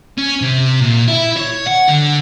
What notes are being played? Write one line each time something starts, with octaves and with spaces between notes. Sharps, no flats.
C#4
C3
A#2
E4
C#5
F#5
D3